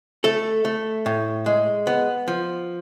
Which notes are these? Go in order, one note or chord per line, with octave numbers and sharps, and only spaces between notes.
A3 A4
A3
A2
G#3
B3
F3